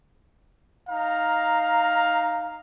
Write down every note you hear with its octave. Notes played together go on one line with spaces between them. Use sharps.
D#4 F5 A#5